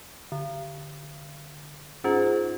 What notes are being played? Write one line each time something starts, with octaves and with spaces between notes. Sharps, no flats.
D3
G#2 C#4 F4